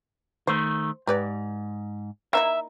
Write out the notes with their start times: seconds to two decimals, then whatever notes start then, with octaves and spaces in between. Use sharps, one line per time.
0.47 D#3 A3 C5
1.07 G#2 G4 B4 D5
2.33 A#3 D#4 E4 E5